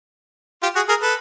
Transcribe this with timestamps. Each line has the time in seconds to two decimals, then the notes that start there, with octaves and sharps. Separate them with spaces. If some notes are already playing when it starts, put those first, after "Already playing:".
0.63 F4 G4
0.75 F#4 G#4
0.89 G#4 A#4
1.02 A4 B4